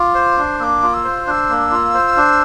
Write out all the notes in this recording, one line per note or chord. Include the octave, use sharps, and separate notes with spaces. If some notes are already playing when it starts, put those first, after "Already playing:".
Already playing: F4 D6
C5
D4
A#3 D6 E6
F4
E6
C5
D4 E6 F#6
A#3
F4
C5
D4